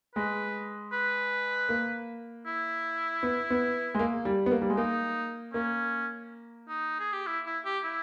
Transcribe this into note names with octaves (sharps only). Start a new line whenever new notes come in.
G#3 B4
B4
A#3
E4
B3
B3
G#3
A#3
G3
B3
A#3
G3
G#3
A#3 D#4
A#3 C#4
D#4
G#4
G4
E4
E4
G4
E4